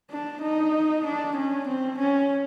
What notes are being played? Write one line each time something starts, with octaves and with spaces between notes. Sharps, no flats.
D4
D#4
D4
C#4
C4
C#4